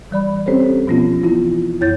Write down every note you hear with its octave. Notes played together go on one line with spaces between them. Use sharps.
E3 G3 D5 B5
C4 C#4 G4 A4 C5 C#5
B2 F3 B3 C#4 F4
E3 B3 E4 F4
F#2 E4 C#5 G6 A6